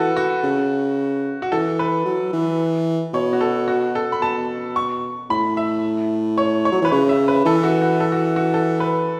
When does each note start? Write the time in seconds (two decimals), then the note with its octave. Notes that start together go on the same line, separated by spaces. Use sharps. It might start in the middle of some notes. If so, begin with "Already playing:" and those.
Already playing: E3 F#4 A4 B4
0.17 F#4
0.44 C#3
1.42 F#4
1.52 E3 A4
1.79 B4
2.05 F#3
2.33 E3
3.13 B2 C#5
3.33 F#4
3.41 A4
3.68 F#4
3.95 A4
4.12 B5
4.22 B2 A5
4.76 C#6
5.30 A2 B5
5.57 E5
6.38 C#5
6.65 C#5
6.72 F#3
6.82 E3 B4
6.92 C#3 C#5
7.09 E5
7.28 B4
7.45 E3 A4
7.63 F#4
7.81 F#4
8.00 A4
8.12 F#4
8.36 F#4
8.54 A4
8.80 B4